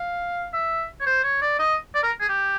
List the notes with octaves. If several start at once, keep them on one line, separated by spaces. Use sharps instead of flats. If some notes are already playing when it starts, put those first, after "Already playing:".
Already playing: F5
E5
C#5
C5
C#5
D5
D#5
D5
A#4
G#4
G4